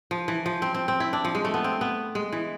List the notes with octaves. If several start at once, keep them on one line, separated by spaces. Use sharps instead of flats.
F3
E3
F3
C4
C4
C4
E4
D4
F3
G#3
A3
B3
C4
B3
G#3
E3